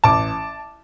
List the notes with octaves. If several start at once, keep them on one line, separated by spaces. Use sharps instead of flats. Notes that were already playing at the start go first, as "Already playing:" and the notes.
A1 A5 D6